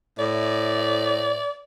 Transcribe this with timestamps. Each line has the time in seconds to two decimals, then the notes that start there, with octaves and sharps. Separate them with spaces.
0.19 A2 D5